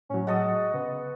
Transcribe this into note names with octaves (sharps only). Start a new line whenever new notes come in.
A2 F#3 C#4
G#3 F#4 A4 D#5
C#3 B3